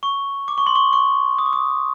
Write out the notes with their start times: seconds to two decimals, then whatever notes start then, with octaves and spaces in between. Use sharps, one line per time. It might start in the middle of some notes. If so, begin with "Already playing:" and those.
0.03 C#6
0.48 D6
0.58 C#6
0.67 C6
0.75 C#6
0.93 C#6
1.39 D#6
1.46 D6
1.53 D#6